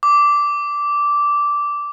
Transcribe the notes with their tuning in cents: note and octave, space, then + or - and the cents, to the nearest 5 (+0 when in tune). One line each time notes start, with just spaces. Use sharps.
D6 -10